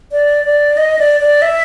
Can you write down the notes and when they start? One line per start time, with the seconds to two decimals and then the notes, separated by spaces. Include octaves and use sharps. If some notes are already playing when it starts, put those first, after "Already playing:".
0.12 D5
0.45 D5
0.77 D#5
0.99 D5
1.20 D5
1.42 E5